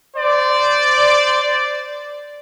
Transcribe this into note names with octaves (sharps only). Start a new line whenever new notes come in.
C5 D5